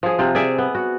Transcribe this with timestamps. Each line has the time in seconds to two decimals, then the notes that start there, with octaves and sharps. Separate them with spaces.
0.03 F3 G#4
0.19 C3 F4
0.35 G#4 D5 E5
0.58 B3
0.75 F#4